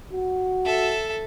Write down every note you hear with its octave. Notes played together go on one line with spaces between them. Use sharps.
F#4
A4 E5